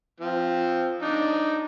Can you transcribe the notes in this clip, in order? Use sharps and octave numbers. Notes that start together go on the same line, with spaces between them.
F3 C4
D4 D#4